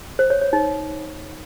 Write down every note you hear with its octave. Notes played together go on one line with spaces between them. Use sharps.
C5
C#5
C#5
D#4